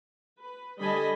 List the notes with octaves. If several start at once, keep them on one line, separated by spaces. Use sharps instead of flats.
B4
D3 G3 D#5 G#5 A5 B5